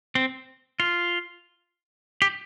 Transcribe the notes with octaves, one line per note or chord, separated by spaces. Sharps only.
C4
F4
G4